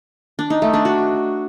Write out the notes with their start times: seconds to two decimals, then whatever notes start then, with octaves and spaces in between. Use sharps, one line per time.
0.39 D4
0.50 D#4
0.62 A3
0.73 D4
0.85 F#4